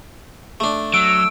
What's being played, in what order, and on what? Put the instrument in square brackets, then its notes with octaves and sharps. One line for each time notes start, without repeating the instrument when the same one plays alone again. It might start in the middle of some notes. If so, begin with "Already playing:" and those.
[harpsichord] A3 D4
[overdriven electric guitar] F#3 [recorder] E6 [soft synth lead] D7